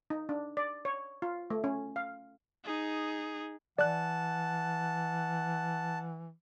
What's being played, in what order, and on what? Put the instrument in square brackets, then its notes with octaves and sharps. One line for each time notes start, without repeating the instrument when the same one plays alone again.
[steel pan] D#4
D4
D5
C#5
F4
A3
C#4
F5
[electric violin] D#4 G#4
[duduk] E3 [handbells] D5 F#6 [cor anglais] F#5 [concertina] A5